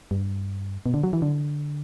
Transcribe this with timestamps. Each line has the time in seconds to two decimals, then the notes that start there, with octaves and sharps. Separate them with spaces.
0.11 G2
0.86 B2
0.94 D3
1.04 F#3
1.13 E3
1.22 D3